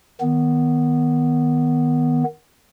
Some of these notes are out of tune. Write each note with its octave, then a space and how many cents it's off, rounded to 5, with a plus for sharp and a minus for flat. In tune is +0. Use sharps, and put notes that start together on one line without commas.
D#3 +5 B3 +0